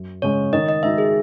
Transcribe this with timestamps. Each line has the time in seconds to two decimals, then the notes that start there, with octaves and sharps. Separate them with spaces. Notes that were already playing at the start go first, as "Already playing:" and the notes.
Already playing: F#2
0.22 C#3 G#3 C#5
0.53 D#3 D#5
0.69 D#5
0.83 G#3 D#4 F#4 E5
0.98 G#4